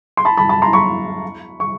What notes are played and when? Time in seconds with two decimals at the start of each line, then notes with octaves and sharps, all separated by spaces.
0.17 C6
0.25 A5 B5
0.37 A5 B5
0.49 A5 B5
0.62 A#5 C6
0.73 B5 C#6
1.60 C#6